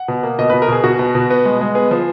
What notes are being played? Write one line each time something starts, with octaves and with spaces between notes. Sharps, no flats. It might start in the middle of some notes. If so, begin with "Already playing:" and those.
Already playing: F#5
B2
A#3
B2 D#5
B2 B4
A#4
B2 G#4
B2 F#4
B2
B2
B3
G#3
G#3
B3 G#4
F3